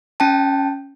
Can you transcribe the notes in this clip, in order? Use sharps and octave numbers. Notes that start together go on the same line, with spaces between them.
C#4 G5 A5